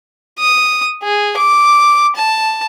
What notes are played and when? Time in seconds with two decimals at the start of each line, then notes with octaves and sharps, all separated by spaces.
0.39 D#6
1.02 G#4
1.37 D6
2.16 A5